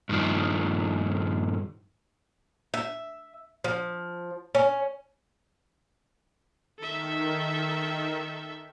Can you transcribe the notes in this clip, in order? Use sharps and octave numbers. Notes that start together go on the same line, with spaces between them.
G2 D#3 F3
E5
F3
C#4
D#3 A4 E5